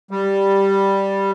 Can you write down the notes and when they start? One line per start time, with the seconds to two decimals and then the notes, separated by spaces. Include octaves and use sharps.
0.11 G3